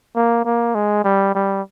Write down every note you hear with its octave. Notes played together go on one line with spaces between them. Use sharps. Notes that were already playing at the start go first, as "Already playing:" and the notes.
A#3
A#3
G#3
G3
G3